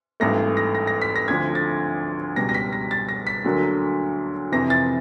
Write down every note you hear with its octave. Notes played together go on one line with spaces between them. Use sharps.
G#1 G2 E3 A3 A#6
A#6
A#6
A#6
B6
A#6
D2 D3 F3 G#6
A6
C#2 B2 G3 A#6
A#6
B6
A#6
A6
A#6
B6
D2 D3 F#3 A#3
F2 C3 E3 A#6
A6